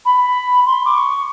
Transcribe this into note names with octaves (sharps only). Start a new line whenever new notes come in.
B5
C6
D6
C#6